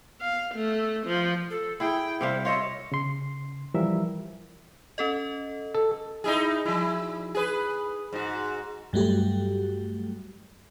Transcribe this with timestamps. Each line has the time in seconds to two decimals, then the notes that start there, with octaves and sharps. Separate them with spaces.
0.20 F5
0.56 A3
1.06 F3
1.50 A4
1.80 E4 G#4 G5
2.21 C3 G3 C5 F5
2.45 F4 C#5 D#5 E5
2.92 C#3 C6
3.74 E3 F3 G3 A#4 E5
4.98 C#4 A4 D#5
5.75 A4
6.24 D#4 E4 G#4
6.66 F3 E4
7.35 G#4 B4
8.13 G#2 F#4
8.93 G2 F#3 G3 A3 F#4 G4